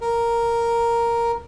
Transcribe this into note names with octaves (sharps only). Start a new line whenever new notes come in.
A#4